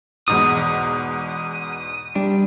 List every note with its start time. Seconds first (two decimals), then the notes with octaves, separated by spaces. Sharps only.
0.28 E2 G#2 B2 D#6
2.15 G3 D4